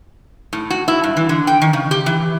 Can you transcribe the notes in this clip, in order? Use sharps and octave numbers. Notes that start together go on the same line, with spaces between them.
A2
F#4
E4
G2
E3
D3
G5
D#3
C#3
G4
E3